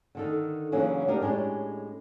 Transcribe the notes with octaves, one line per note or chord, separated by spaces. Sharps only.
D3 D#3 A4
C#3 E3 F#3 A#3 C#4 D4
D4 D#4 G4 A#4
A2 G#3 C#4 D4 G4